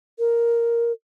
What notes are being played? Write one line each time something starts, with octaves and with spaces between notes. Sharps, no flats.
A#4